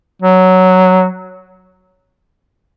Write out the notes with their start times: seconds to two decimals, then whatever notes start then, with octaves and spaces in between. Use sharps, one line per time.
0.22 F#3